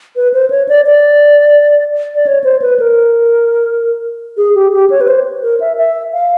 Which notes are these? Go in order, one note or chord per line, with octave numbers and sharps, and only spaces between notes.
B4
C5
C#5
D5
D5
D5
C#5
C5
B4
A#4
G#4
G4
G4
C#5
B4
C5
A#4
E5
E5
F5